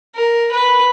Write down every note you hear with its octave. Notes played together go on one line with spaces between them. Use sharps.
A#4
B4